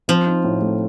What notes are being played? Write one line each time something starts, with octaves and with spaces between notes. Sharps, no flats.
F3 C4
D#4
A2
A3